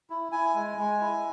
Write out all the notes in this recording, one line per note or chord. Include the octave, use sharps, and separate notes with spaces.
E4
E4 G#5
G#3
G#3
E4